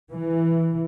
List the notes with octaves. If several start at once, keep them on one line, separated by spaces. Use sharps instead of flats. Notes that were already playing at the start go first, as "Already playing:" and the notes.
E3